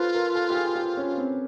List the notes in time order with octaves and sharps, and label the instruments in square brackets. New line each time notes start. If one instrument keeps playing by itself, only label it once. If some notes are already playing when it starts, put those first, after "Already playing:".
Already playing: [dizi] F4 [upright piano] A4 B4 C5
[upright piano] A#4
A4
G4
G#4
G4
C#4
C4